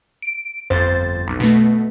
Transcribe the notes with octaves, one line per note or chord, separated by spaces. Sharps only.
D7
G1 F2 C5 A6
B1
B2 A3